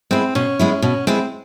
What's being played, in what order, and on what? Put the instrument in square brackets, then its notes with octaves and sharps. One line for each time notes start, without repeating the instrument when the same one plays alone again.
[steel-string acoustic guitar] G#3 B3 E4 [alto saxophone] C4
[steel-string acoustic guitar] B2 [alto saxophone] C#4
[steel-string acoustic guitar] G#3 B3 E4
[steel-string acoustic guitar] B2 [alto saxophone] C#4
[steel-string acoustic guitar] G#3 B3 E4 [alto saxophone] C4